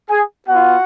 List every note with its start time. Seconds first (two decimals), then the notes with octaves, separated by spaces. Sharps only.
0.10 G#4 G#5
0.49 B3 F4 F#4 F#5